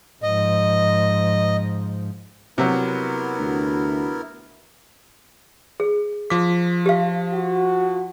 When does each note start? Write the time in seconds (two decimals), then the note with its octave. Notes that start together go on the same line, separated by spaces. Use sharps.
0.23 G#2 F3 D#5
2.58 C3 F#3 B3 E4 A#4
3.39 D2
5.80 G#4
6.30 F3 D6 B6
6.86 G4 F5
7.33 F#4